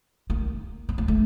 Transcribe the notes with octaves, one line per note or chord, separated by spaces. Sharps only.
A#3
B3
A#3
A3